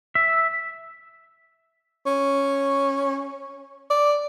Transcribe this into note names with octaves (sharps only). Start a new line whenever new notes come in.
E5
C#4
D5